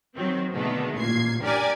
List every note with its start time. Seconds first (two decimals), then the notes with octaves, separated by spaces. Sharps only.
0.15 D#3 F#3 C4
0.53 B2 D3 D#3 G#3 A3 B3
0.96 A1 A#2 G#6 C7
1.42 D4 G4 A#4 D5 G#5 D6